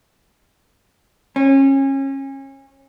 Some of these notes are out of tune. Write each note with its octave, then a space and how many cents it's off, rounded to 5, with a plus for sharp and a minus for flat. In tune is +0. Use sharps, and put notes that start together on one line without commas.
C#4 -30